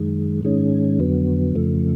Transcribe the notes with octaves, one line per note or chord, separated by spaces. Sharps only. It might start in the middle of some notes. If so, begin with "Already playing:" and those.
Already playing: F#2 D#3 G#3
G#2 D#3 G#3 C#4
F2 D3 F#3 B3
F2 C#3 F3 A3